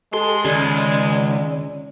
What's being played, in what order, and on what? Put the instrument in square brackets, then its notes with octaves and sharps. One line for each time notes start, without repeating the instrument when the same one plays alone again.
[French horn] G#3 [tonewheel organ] G4 A4 A5 [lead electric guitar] C6
[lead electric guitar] C#2 [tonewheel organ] D#3 C#4 [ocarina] D5